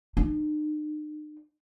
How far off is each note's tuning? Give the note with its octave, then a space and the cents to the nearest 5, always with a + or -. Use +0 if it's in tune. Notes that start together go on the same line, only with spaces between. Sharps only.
D#4 -45